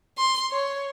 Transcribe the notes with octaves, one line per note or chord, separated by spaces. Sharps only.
C6
C#5